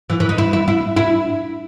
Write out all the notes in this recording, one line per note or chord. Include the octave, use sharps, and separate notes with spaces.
E3
E3
D#4
E4
E4
E4
E4